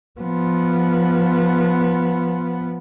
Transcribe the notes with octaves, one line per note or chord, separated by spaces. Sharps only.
F3 B3